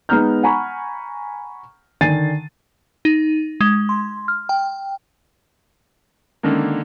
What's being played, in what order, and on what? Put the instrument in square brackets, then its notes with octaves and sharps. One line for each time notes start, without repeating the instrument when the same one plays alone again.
[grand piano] G#3 B3 D#4 A#5 F6 G6
F#5 G#5 A#5 B5 C#6
D3 D#3 G#5 A6 C7 D#7
[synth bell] D#4
G#3
C6
F6
G5
[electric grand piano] D3 D#3 A#3 [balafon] G#3 C#4